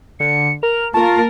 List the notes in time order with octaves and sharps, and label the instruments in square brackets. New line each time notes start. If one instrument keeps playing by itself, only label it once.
[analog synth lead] D3 [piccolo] C#7
[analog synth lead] A#4 [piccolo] F7
[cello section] A#3 A#4 [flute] F4 [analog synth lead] A5 [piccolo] C#6